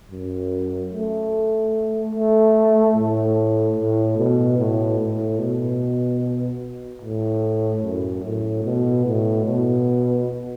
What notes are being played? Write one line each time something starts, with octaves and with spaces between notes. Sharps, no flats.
F#2
A3
A3
A2
A2
B2
A2
A2
B2
A2
F#2
A2
B2
A2
B2